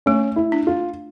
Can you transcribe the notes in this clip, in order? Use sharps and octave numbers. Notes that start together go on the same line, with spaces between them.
A3 C#4
E4
D4
F4